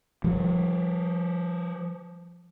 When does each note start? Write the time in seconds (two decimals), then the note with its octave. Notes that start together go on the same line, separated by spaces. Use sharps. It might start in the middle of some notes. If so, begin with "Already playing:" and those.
0.24 F3 G3